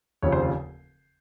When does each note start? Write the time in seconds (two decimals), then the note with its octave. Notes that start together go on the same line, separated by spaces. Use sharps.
0.22 F1 D#2 C#3 F3 C#5
0.32 C5
0.42 F4